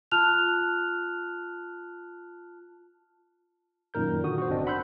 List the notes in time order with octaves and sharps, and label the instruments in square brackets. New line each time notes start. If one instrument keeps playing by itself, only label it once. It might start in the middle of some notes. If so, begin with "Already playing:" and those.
[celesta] F4 A5 F6 F#6 F7
[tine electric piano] F#2 A#2 D#3 A#4 G6
D3 F#4 D#6
F#4 C5
G1 C4 D4 D#5
F#5 B5 C6 E6 F#6 G6